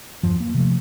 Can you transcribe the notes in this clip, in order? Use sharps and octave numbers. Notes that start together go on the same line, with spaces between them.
E2 G2 F3
A#3
C3 F3 A3